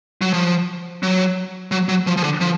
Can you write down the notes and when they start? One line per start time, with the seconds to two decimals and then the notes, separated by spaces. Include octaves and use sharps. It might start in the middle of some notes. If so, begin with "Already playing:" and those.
0.21 F#3
0.33 F3
1.03 F#3
1.72 F#3
1.89 F#3
2.07 F3
2.17 F3
2.24 D3
2.41 F3